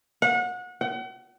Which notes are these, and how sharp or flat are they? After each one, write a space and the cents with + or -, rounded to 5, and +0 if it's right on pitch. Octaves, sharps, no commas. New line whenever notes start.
F#5 -30
F#5 +40